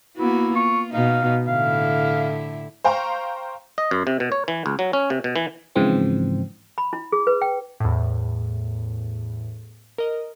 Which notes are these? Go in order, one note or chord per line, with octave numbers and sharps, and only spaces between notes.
A#3 B3 E4 F#4
F4 C#6
B2 D#4 F5
A2 D3 E4 F5
C5 F5 G5 A#5 C6 C#6
D#5
F#2
C3
B2
C#5
E3
C#2
F#3
C#4
C3
B2
E3
G#2 C#3 E3 F3 C4
B5
E4
G#4
B4
G5
E2 A2
A#4 D#5